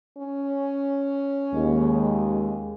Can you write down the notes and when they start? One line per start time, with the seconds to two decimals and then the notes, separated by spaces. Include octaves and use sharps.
0.18 C#4
1.53 D#2 G#3